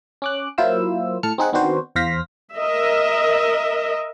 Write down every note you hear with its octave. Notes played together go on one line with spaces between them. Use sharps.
C#4 D6 F#6
F#3 A#3 E4 F4 C5 E6
A2 A5 F6 C#7
C4 D#4 G#4 F#5
D#3 B3 C4 D4 F#4 C5
E2 C5 F5 A#6 B6
A#4 D#5 E5